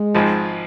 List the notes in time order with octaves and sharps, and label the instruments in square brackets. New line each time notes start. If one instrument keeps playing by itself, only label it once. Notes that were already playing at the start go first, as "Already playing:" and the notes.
Already playing: [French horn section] G#3
[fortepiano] G#1 G#2 F3